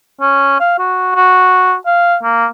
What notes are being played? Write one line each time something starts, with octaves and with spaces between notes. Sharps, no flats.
C#4
F5
F#4
F#4
F5
A#3